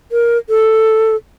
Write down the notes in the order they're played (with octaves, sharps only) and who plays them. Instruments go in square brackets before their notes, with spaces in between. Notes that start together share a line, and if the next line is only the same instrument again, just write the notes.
[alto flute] A#4
A4